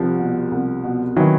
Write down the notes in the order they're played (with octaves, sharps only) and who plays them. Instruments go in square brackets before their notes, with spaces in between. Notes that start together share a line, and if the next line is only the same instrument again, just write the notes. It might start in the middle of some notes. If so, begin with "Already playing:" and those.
Already playing: [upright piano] C2 [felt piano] F3 G3
[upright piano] B2
C2
B2
[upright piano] D#3 [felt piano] E3 F#3